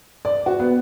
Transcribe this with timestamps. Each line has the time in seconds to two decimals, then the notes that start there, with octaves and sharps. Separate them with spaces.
0.25 D5
0.46 F#4
0.60 B3